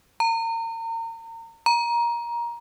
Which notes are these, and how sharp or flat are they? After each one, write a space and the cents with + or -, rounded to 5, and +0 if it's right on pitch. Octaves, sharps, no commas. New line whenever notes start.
A#5 -35
A#5 +20